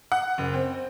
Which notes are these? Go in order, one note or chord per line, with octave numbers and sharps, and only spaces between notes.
F#5
F#1
C4